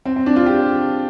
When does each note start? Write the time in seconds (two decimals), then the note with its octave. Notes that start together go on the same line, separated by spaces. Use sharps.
0.06 C4
0.16 C4
0.26 D4
0.36 F4
0.46 G4